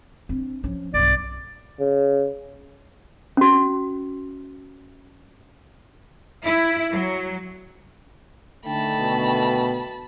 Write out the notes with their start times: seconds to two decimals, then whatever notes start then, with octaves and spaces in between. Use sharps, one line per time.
0.29 C4 D4
0.64 F3 C#4
0.94 B1 G2 D5
1.80 C#3
3.37 C#4 F#4
6.43 E4
6.90 F#3
8.66 D3 D#3 A3 G5 A5 B5
9.00 B2